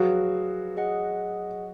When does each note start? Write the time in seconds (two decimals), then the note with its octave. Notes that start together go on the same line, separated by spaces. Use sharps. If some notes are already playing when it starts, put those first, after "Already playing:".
Already playing: F#3 F#4 G#4 B4 F5
0.77 G#4 D#5 F#5